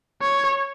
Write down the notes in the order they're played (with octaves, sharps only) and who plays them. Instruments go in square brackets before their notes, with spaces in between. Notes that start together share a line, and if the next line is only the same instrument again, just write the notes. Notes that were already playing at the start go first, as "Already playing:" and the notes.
[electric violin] C#5